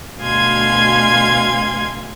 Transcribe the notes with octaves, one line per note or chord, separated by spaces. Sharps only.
D2 B2 F5 G#5 C6 G#6